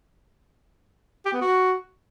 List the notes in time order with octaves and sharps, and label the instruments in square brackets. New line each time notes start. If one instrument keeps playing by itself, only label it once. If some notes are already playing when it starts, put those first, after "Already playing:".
[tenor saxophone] G4
B3
F#4